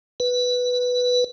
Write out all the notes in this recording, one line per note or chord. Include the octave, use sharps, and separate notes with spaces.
B4